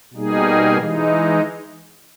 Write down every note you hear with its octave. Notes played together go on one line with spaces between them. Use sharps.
B2 G3 A#3 D#4 G#4
E3 G#3 D#4